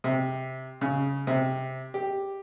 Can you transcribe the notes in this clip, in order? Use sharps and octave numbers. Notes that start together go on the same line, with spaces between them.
C3
C#3
C3
G4